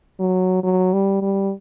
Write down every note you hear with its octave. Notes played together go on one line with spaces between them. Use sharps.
F#3
F#3
G3
G3